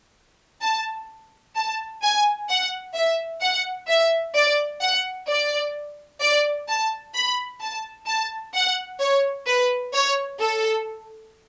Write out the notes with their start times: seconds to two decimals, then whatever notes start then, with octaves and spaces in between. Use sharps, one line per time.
0.62 A5
1.56 A5
2.03 G#5
2.49 F#5
2.95 E5
3.41 F#5
3.89 E5
4.35 D5
4.81 F#5
5.28 D5
6.21 D5
6.68 A5
7.15 B5
7.61 A5
8.07 A5
8.54 F#5
9.00 C#5
9.47 B4
9.94 C#5
10.41 A4